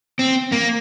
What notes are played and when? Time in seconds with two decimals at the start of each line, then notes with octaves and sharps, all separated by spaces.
0.19 C4
0.52 A#3